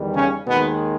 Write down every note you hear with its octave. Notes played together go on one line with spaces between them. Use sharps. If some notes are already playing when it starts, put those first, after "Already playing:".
Already playing: E2 D#3 G3
C#3 C#4
D#2 B2 D#3 G#3 B3